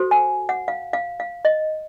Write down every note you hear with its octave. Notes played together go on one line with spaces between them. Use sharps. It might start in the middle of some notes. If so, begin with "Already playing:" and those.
Already playing: F#4 A4 C5
G#5
F#5
F5
F5
F5
D#5